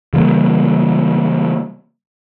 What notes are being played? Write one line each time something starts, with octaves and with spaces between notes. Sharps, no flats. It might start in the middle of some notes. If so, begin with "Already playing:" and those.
C#3 E3 G3 A#3